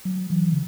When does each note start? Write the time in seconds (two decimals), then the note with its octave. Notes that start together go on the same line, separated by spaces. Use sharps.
0.05 F#3
0.30 E3
0.53 C#3